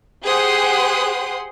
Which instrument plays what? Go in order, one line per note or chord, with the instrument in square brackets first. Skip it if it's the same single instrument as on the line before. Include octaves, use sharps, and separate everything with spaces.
[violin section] G4 G#4 C5 F#5 C6 D#6